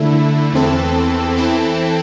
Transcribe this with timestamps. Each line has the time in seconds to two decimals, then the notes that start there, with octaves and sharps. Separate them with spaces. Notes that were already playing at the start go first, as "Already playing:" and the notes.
Already playing: D3 A3 E4
0.52 E2 E3 C4 A4
1.37 E3 C4 E4 A4